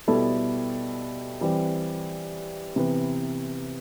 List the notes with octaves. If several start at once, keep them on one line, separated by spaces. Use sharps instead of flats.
B2 G3 B3 E4 A4
E3 G3 C4 G4
C3 E3 B3